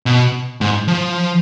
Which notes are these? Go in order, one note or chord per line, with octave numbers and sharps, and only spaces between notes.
B2
G#2
F3